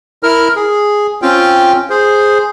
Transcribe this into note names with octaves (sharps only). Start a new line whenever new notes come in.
E4 A#4 F6
G#4
C4 C#4 F4 G5
G#4 C5